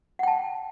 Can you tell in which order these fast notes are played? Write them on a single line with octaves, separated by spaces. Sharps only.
F#5 G5 A5